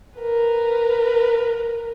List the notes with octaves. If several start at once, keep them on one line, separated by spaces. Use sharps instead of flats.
A#4 B4